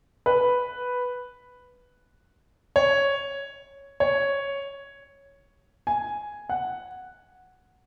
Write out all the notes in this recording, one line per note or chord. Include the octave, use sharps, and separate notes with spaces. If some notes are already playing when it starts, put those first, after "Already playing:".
B4
C#5
C#5
G#5
F#5